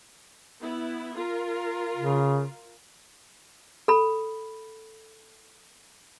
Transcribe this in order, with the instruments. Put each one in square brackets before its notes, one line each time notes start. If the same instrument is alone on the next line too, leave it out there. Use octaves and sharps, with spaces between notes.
[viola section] B3 E4
F4 A#4
[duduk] C#3
[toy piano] A4 B5